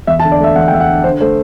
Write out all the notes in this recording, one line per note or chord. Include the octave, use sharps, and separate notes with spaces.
E2 E5
A5
D3
D5
A3 E5
E2 F#5
G5
E2 E5
F#5
D3
D3 C5
A3 C5